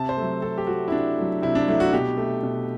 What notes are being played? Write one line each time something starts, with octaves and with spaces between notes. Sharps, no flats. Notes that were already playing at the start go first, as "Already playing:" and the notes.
Already playing: C3 A5
C5
F#3 A3
C3 A4
G4
F#3 A3 F#4
E4
C3 D4
F#3 A3
C3 E4
D4
F#3 A3 E4
F#4
B2 G4
A3
B2